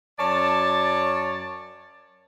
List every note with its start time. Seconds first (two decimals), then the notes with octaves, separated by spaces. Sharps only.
0.19 F#2 C#5 D5 A5